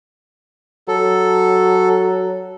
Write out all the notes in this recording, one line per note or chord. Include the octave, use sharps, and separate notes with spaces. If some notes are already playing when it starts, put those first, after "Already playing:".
F#3 A4